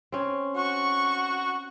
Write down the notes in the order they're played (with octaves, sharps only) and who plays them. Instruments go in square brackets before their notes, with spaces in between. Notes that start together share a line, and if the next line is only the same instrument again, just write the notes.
[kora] C4 C#4
[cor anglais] F#4 [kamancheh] C#6